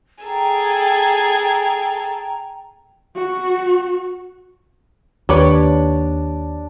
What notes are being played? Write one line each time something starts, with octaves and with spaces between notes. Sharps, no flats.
G#4 A4 G5 A#5
F#4
D#2 D4 G4 B4 C#5 D6